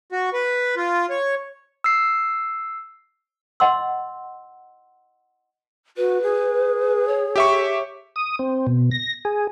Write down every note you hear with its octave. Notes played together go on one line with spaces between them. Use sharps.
F#4
B4
F4
C#5
E6 C7
D#5 F#5 C6 E6
F#4 B4
G#4
C#5
G4 E5 C#6
D#6
C4
B2
A#6
G#4